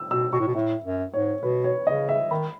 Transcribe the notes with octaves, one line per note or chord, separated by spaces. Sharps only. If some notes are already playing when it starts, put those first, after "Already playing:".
Already playing: E6
B2 E6
B2 C#6
A2
B2
A2 E5
F#2
G#2 C#5
B2 B4
C#5
C#3 D#5
E5
D#3 B5